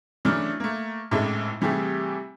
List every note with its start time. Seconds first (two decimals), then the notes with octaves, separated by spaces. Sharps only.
0.25 C#3 E3 F#3 A3 D4 F6
0.60 A3 A#3
1.11 G#1 A2 C#3 G#3 A4 E5
1.61 C3 E3 G3 A3 G4 G#4